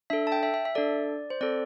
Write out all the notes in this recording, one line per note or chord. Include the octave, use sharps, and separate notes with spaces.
D4 A4 E5
A5
G5
E5
E5
E5
D4 A4 D5
C5
C4 A4 D5